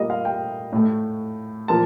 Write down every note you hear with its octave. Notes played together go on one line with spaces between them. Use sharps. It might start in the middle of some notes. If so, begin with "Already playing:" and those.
Already playing: A#2 G3 A#3 D#5
F5
G5
A2 A3
A#2 F3 A#3 A5